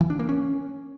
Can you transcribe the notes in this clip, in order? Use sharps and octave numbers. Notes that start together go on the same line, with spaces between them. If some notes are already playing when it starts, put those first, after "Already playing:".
E3
D4
A#3
C#4